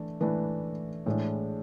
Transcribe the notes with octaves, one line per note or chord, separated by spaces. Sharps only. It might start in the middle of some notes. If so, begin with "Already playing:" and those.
Already playing: E3 A3 D4
E3 A3 D4 B4
A2 E3 G#3 D4